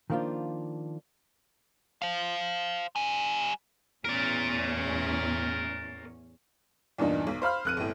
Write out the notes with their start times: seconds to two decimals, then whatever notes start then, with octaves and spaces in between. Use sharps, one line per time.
0.10 D#3 F3 A#3 D4 F4
2.02 C5 F5
2.96 G3 G#5
4.05 E2 A2 C#4 A#4 D5
6.98 E2 G2 A#2 D4 D#4
7.27 B1
7.42 C5 F5 B5 F6
7.65 F1 F#6 D#7
7.77 G1 A2